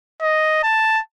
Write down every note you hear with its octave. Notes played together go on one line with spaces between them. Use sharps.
D#5
A5